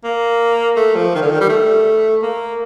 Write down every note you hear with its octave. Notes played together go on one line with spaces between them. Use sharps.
A#3
A3
F3
D#3
D3
D#3
G3
A3
A#3